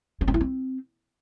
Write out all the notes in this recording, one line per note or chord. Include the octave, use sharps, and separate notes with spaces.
C#4
C4
E4
C4